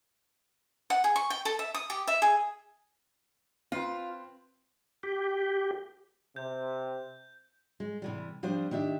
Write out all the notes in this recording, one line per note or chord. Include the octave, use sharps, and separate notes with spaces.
F#5
G#4
C#6
G5
A4
E5
D#6
G4
E5
G#4
C4 F4 B4
G4
C3 G6
G#3
C3 E3 G3
F3 G3 C4 D4 C5
D#3 D4 G4 E5